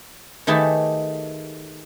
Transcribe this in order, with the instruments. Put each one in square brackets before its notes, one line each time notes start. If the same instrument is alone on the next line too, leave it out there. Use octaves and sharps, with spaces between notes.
[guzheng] D#3 A3 G4 G#4 B4 A5